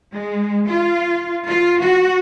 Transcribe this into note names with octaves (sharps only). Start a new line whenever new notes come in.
G#3
F4
F4
F#4